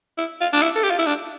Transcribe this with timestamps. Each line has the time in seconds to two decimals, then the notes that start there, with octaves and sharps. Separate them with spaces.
0.18 E4
0.41 F4
0.53 D4
0.62 E4
0.76 A4
0.84 G4
0.91 F4
0.99 E4
1.06 D4